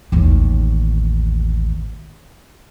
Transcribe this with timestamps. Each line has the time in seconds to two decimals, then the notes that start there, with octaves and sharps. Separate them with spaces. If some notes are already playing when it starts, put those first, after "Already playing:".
0.12 A1 D#2